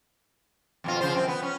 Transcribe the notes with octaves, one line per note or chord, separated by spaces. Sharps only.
F2 B2 F4
C#3 F3 C5
F#2 C4
B3
C#4